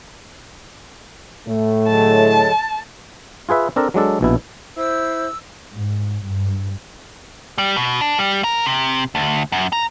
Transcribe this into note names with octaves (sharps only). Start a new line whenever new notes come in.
A2 A3
D3 F#3 G#3 A5
F4 G#4 B4 E5
C4 D4 A4 A#4
F#3 G#3 D4 A4
A#1 B2 E4
E4 C5 E6
G#2
G2
G3
B2
D4
G3
A#4
C3
D2
F#2
A#5